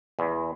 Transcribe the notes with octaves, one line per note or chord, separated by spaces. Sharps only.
E2